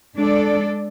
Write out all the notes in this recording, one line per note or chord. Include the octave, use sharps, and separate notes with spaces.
G#3 D4 A4 D5